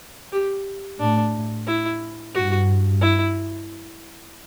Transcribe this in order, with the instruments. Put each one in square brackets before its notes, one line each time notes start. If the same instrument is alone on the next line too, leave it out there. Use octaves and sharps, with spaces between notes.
[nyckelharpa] G4
[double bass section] A2 [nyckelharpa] D4
[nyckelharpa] E4
[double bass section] G2 [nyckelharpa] F#4
[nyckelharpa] E4